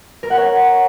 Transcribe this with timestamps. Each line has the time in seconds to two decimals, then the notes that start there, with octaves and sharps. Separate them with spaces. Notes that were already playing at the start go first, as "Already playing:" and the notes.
0.23 A#4
0.30 F#5
0.38 C#5